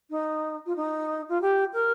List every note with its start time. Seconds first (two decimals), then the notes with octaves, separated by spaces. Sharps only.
0.10 D#4
0.66 F4
0.75 D#4
1.28 F4
1.41 G4
1.73 A#4